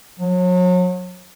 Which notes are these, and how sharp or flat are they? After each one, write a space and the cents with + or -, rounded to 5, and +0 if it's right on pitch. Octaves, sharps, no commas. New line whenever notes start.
F#3 -35